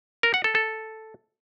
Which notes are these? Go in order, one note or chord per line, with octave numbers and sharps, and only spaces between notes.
A#4
F#5
A4
A4